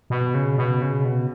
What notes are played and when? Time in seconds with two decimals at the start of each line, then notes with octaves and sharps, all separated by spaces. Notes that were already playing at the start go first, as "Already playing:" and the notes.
0.10 B2
0.35 C#3
0.58 B2
0.82 C#3
1.05 B2